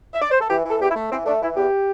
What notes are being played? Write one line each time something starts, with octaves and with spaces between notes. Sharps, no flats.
E5
D5
C5
A4
E3 G4
E3 A4
E2 G4
E4
A3
E3 C4
A3 D4
E3 E4
E2 G4